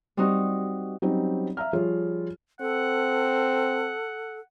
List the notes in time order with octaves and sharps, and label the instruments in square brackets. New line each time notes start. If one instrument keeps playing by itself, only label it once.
[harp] G3 C4 D#4 F#4
[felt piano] F#3 G3 C4 C#4 D#4 G4
E5 F5 A#5 F6
F3 G3 F4 G#4 C#5
[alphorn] C4 [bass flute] A4 [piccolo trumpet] F#5